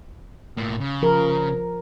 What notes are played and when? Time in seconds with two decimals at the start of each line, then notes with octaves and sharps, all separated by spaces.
0.57 A2 A#3
0.80 C#3
1.02 F3 A#4